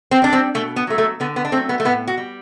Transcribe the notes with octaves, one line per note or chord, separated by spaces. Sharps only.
C4
G3 D4
C4
B2 A3
B3
F#3 A3
A3
D3 B3
B3
D4
F#3 A3 C4
B3
A3
A2 B3
F#4
G3